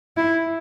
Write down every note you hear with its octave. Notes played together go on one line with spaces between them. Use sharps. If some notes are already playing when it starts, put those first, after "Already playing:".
E4